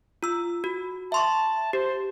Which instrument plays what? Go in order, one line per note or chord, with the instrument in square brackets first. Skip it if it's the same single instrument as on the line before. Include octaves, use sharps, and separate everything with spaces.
[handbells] F4 E6
F#4
[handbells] E5 C6 C#6 [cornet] A5
[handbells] G4 [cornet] C5